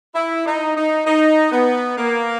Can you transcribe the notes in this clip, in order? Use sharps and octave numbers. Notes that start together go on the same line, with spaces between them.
E4
D#4
D#4
D#4
B3
A#3